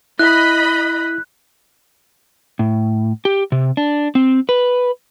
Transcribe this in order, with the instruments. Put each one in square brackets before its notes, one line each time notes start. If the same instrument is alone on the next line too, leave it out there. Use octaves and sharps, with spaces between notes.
[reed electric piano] E4 [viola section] D#5 B5 [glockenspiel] F#6
[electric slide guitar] A2
G4
C3
D4
C4
B4